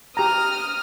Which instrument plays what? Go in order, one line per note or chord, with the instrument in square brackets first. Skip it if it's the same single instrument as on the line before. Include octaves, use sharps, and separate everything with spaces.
[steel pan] G4 A#5 [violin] D#6 F6